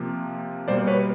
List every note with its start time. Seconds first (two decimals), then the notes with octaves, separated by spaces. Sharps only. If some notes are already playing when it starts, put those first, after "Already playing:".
Already playing: C3 F3 A#3
0.68 B2 G3 A#3 C5 D5
0.87 B4 C#5